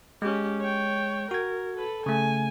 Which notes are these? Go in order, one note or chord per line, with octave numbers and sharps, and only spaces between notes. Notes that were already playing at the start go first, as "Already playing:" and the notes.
G#3 C#4 G4
C#5 G5
F#4 A#4 G#6
A4 B4
C#3 A3 G#5